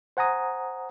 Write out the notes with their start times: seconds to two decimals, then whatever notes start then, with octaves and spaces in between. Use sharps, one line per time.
0.17 C5 F#5 G#5 A#5 D#6